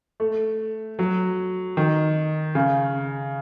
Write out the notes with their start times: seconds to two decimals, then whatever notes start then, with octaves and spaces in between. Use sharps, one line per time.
0.20 A3
0.99 F#3
1.77 D#3
2.55 C#3